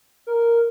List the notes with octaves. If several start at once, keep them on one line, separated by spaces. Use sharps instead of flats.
A#4